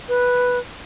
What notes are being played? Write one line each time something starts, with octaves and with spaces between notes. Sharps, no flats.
B4